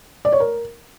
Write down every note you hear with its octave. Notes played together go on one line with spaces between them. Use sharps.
D5
C#5
A#4